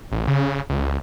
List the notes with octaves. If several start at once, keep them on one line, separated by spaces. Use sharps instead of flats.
A1
C#3
C#2